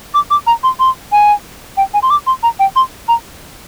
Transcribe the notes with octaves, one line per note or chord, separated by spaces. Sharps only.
D6
D6
A#5
C6
C6
G#5
G5
G#5
C6
D6
C6
A#5
G5
C6
A#5